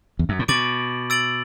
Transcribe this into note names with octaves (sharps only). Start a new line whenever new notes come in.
E2
F#2
A2
B2 D6 A6 D7 F#7
E6 A6 D7 F#7